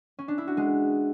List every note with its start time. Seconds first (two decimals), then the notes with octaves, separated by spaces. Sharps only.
0.19 C#4
0.28 D4
0.38 E4
0.48 F#4
0.57 G#3